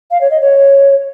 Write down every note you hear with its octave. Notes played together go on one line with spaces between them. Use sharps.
F5
C#5
D#5
C#5